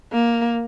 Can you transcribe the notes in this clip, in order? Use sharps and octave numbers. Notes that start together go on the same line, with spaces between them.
A#3